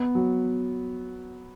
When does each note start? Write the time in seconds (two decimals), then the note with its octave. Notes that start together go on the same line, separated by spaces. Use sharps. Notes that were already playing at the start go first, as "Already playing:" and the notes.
Already playing: B3
0.15 F#3